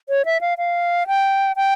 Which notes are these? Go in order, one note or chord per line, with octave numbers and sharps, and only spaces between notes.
C#5
E5
F5
F5
G5
G5